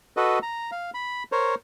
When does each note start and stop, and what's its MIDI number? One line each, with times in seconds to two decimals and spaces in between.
0.17 0.39 66
0.17 0.39 69
0.17 0.39 71
0.17 0.39 75
0.43 0.71 82
0.72 0.90 77
0.94 1.23 83
1.32 1.55 70
1.32 1.55 72
1.32 1.55 73